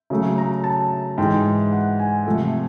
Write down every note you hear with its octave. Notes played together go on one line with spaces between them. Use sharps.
C#3 F#3 A3
A#5
A5
G#2 E3 G#3 G5
F#5
G#5
C3 F3 A3